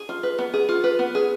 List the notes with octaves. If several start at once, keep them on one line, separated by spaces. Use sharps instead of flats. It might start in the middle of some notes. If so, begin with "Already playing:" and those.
Already playing: G#4
F4
B4
B3
G#4
F4
B4
B3
G#4